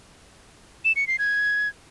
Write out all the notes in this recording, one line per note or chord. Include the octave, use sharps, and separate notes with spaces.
E7
C#7
C7
G#6